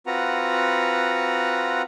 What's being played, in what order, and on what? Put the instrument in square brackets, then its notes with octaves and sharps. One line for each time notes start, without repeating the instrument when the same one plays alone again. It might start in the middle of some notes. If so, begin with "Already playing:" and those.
[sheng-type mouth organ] C4 F4 F#4 B4 F#5 A#5